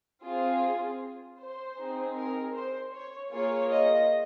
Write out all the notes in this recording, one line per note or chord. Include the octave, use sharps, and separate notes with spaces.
C4 F4 G#4
C5
C4 D#4 G#4
A#4
C5
C#5
A#3 F4 G#4 C#5
D#5